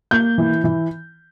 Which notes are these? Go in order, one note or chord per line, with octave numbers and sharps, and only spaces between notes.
A#3 G6
E3
E3